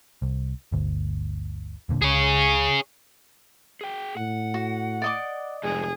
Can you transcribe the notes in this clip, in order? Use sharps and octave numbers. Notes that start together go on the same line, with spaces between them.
C2
G1 D2
E1 A#2 D3
C#2 G#4 C#5
G#4 G5
A2 F#5
F#4
D5 D#5 D6
F1 F2 G#2 G#4